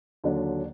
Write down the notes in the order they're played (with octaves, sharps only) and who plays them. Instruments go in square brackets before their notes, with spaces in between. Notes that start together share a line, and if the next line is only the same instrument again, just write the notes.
[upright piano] D#2 D3 F#3 D4